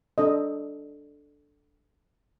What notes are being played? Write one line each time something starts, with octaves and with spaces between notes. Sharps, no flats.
D4 A4 D#5